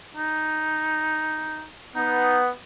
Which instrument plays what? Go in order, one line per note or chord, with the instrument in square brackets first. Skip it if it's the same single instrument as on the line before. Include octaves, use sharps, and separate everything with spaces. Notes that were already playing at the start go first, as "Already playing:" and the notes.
[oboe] D#4
[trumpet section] B3 [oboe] D#4